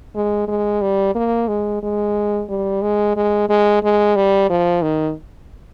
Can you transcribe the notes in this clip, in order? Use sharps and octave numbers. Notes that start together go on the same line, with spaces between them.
G#3
G#3
G3
A#3
G#3
G#3
G3
G#3
G#3
G#3
G#3
G3
F3
D#3